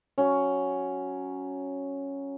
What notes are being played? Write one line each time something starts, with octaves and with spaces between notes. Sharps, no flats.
F#3 C#4